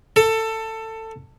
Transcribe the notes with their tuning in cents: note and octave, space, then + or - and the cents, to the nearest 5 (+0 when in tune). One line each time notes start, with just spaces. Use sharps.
A4 +20